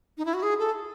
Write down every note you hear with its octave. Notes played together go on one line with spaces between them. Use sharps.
D#4
E4
F#4
G#4
A4